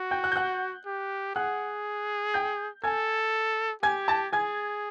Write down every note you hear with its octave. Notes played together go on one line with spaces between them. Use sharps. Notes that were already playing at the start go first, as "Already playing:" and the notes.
Already playing: F#4
G5 G6
F#5 F#6
G6
F#5 F#6
G4
G#4 F#5 F#6
G5 G6
A4 G#5 G#6
G4 G#5 G#6
A5 A6
G#4 G#5 G#6